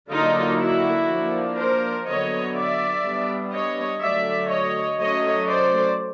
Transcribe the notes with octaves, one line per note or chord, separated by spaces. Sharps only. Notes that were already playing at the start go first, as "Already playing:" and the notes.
D3 F#3 A#3 D4 D#4 F4
E4 F#4
F3 A#3 D4
A#4 C5
D3 F#3 B3 C#5 D#5
D5 E5
G3 B3 D4
C#5 D#5
D3 F#3 A3 D5 E5
C#5 D#5
F#3 A3 C#4 C#5 D#5
C5 D5